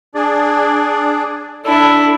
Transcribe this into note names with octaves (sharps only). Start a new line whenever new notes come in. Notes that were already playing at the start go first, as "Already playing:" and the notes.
D4 G#4 D5
D4 E4 A4